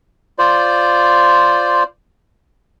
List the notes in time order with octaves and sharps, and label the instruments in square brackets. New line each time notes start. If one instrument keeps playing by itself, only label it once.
[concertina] F4 C5 D5